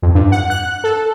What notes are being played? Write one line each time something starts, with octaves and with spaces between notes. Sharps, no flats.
F2
G2
F#5
F#6
A4